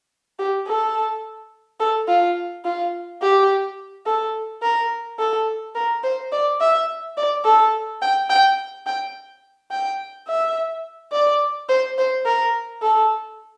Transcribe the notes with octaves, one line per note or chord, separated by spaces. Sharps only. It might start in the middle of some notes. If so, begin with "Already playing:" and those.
G4
A4
A4
F4
F4
G4
A4
A#4
A4
A#4
C5
D5
E5
D5
A4
G5
G5
G5
G5
E5
D5
C5
C5
A#4
A4